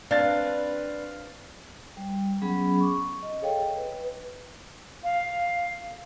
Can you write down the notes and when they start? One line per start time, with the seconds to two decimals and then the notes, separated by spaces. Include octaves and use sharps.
0.11 C4 D4 B4 F5 A6
1.97 G3
2.42 F#3 B3 C#4 G#4 B5
2.80 C#6 D6
3.23 D#5
3.42 G#4 A4 C#5 D#5 F5 G5
3.77 B4
5.03 F5